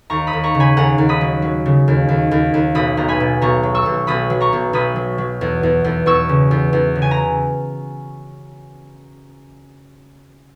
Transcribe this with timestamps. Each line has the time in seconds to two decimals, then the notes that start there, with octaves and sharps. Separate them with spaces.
0.10 D#2 A#5 C#6
0.27 B5 D#6
0.33 D#2
0.44 A#5 C#6
0.55 C#3
0.60 G#5 B5
0.77 D#2 F#5 A#5
0.98 D#2
1.09 B5 D#6
1.21 F#3
1.42 F#3
1.66 C#3
1.88 D#2
2.09 D#2
2.31 D#2
2.54 D#2
2.75 B1 B5 D#6
2.97 B1 A#5
3.08 G#5 B5
3.20 B2
3.41 B1 A#5 C#6
3.63 F#3
3.75 C#6 E6
3.86 B1
4.07 B1 B5 D#6
4.30 F#3
4.40 A#5 C#6
4.53 B1
4.73 B1 B5 D#6
4.96 F#3
5.18 F#3
5.41 E2
5.63 E2
5.84 E2
6.06 E2 C#6 E6
6.29 C#3
6.51 E2
6.73 E2
6.96 C#3
7.02 G#5
7.11 A#5